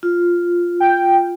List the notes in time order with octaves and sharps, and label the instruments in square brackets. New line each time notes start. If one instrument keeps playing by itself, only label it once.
[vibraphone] F4
[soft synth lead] G5